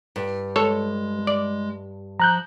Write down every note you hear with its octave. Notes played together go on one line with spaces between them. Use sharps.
G2
G#3 A4 C#5
D5
F3 A#5 F#6 G6